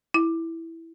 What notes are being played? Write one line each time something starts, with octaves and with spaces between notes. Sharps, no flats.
E4